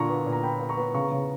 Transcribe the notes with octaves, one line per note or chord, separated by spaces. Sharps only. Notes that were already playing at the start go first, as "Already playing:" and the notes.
Already playing: A#2 D3 A#5 C#6
B3
A#2
A#5
B3 G5 B5
B3
A#5 C#6
B3
C#3 A#5 C#6
C#3